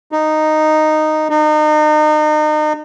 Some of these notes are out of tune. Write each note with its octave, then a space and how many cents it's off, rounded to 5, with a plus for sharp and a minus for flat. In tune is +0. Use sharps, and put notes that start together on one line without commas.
D#4 -10
D#4 -35